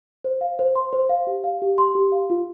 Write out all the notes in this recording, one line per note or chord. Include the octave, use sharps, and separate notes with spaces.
C5
F5
C5
C6
C5
F5
G4
F5
G4
C6
G4
F5
F4